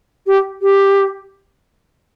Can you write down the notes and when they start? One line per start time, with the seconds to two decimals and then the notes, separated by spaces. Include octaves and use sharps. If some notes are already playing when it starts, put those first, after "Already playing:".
0.26 G4
0.61 G4